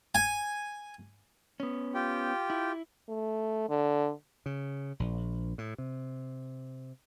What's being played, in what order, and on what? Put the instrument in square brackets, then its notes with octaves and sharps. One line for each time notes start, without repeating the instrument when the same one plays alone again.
[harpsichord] G#5
[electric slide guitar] B3 C#4
[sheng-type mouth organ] F4 G4 G5
[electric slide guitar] E4
[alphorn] A3
D3
[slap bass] C#3
A#1
A2
C3